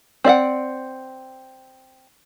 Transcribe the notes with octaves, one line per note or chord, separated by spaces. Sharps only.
C4 D5 E5 F#5